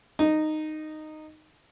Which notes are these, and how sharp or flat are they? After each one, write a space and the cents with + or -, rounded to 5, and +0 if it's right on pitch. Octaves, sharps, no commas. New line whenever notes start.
D#4 -10